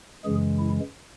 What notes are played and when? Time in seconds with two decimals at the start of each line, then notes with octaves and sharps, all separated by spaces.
0.25 F#2 C#3 E3 G#3 G#4
0.58 E4